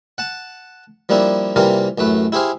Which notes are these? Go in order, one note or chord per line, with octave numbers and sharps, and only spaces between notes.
F#5 A5
F3 G3 A#3 D4 E4
C3 E3 G3 A#3 F4 A#4
A1 F#2 A3 B4
E4 G4 G#4 C5 F5